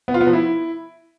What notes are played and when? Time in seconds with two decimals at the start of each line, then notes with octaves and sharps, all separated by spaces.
0.08 B3
0.14 F4
0.21 B3
0.27 F3
0.33 E4